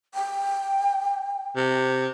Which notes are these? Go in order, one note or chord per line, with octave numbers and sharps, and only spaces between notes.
G5
C3